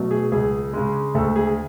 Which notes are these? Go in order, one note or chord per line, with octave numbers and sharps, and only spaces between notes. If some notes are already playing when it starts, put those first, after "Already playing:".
Already playing: B2 F#3 A3
G#4
C#2 G#4
C#3 G#3
D2 A4
G#4